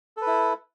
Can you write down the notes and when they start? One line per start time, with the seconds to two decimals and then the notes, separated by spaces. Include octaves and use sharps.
0.17 A4
0.22 B4
0.27 E4